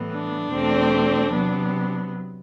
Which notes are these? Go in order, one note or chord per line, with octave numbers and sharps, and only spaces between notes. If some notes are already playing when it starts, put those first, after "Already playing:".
Already playing: A2 E3 G3 B3
D4
E2 B2 A3 C4
C3 F#3 B3